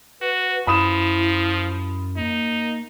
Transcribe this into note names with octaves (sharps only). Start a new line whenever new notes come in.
F#4 B4
F#2 F3 E4 B5 D#6 E7
A#3 D#4